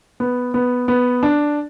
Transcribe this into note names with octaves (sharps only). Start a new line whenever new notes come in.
B3
B3
B3
D4